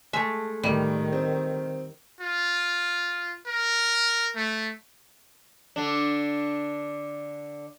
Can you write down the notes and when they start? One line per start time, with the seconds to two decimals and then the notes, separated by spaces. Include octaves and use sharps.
0.13 G#3 A3 E5
0.63 A2 D#3 G3
1.12 C4
2.21 F4
3.47 A#4
4.36 A3
5.76 D3 D4